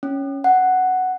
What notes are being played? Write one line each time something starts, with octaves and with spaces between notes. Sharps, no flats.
C#4
F#5